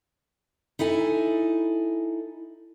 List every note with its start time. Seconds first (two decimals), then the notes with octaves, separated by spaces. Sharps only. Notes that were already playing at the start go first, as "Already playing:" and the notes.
0.79 D#4 E4 A4 G#5